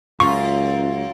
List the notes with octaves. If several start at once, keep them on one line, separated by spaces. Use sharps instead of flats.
C#2 F#2 F4 C#6